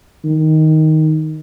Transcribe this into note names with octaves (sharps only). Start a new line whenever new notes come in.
D#3